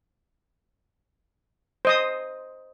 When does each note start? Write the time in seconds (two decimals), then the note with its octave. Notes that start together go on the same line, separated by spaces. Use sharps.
1.85 C5 D#5 D#6